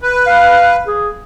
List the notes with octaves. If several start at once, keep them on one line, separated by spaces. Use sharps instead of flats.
B4
F5
G#4